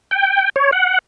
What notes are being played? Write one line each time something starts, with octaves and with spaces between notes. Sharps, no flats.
G5
C#5
F#5